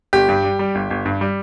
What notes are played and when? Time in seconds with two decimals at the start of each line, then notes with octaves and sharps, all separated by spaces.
0.13 G1 G4
0.29 G2
0.44 G3
0.59 G3
0.75 G1
0.90 G1
1.06 G2
1.21 G3